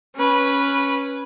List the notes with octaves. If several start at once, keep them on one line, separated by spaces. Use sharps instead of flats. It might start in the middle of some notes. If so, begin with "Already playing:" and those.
C#4 B4